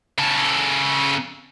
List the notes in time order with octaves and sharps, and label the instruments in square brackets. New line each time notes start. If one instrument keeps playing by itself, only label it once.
[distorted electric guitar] C#3 A4